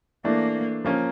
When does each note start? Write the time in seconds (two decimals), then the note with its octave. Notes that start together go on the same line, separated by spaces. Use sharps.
0.24 E3 A3 A#3 D4
0.84 F3 A#3 C#4